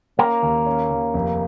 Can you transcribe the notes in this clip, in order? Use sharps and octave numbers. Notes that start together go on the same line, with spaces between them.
A#3 C#4
D#2
C#4
D#2
F1